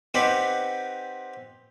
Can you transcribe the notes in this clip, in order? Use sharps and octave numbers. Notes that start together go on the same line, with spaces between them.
C4 D#4 G4 B4 D5 F#5